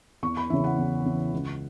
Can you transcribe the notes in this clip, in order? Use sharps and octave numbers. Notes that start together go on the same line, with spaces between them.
E2 C#6
B5
C#3 E3 E5
F#5
E2
C#3 E3
C#2